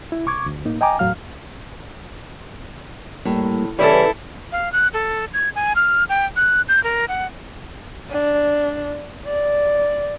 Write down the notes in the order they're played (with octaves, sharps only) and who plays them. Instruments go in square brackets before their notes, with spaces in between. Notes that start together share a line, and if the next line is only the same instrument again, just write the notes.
[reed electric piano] E4
C2 C#6 D6 G#6
D2
A2 A#3 D#4
D#5 G5 G#5 A#5 D6
E2 A2 F#3 F5 F6
[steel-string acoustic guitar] A2 [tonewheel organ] G3 A#3
[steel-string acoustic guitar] C#3 E3 G3 [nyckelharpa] E4 A4 [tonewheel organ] B4 C#5 G#5
[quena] F5
F#6
A4
G#6
G#5
F6
G5
F#6
G6
A#4
F#5
[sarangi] D4
D5